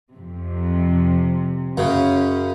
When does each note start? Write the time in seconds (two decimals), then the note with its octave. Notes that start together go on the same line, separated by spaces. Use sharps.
0.11 F2 C3
1.77 F#2 C#3 C#4